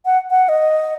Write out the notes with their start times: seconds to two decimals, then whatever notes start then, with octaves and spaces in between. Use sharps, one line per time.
0.05 F#5
0.30 F#5
0.49 D#5